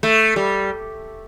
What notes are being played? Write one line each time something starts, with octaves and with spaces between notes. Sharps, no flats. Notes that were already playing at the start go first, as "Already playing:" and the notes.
A3
G3